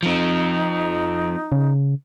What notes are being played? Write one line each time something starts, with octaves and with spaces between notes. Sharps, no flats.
F3 C4 D#4
C#3